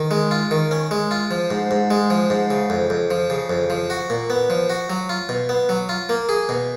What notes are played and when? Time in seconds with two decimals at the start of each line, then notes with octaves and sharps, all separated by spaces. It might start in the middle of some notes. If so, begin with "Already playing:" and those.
Already playing: D#3
0.11 G#3
0.31 F4
0.51 D#3
0.71 C#4
0.91 G#3
1.11 F4
1.31 F3
1.51 G#2
1.71 G#2
1.91 G#3
2.10 F3
2.30 G#2
2.50 C#3
2.70 F2
2.90 F2
3.11 F3
3.30 C#3
3.50 F2
3.70 F3
3.90 F#4
4.10 A#2
4.30 B3
4.50 F3
4.70 F#4
4.90 F#3
5.09 F4
5.29 B2
5.49 B3
5.69 F#3
5.89 F4
6.09 A#3
6.29 G#4
6.49 B2